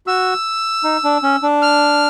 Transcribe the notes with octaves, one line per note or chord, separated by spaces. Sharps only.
F#4 E6
D#4
D4
C#4
D4
F6